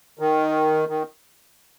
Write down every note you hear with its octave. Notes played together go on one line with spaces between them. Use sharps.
D#3
D#3